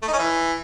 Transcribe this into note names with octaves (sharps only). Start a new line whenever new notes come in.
A3
D#4
C#4
E3